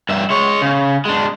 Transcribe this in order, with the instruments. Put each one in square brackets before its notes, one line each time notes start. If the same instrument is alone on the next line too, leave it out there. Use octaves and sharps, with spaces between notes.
[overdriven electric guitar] G2 E5
G#3 C#5
C#3
G#3 D4